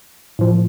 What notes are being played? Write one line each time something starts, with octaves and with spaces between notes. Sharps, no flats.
A2 F3